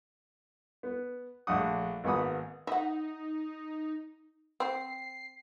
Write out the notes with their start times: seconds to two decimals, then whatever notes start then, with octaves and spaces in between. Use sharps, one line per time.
0.83 B3
1.47 A#1 A3 D4 F#5 D#6
2.04 G#1 A#3 B3 F#5 B5 D#6
2.67 D#4 E5 F#5
4.60 C4 C7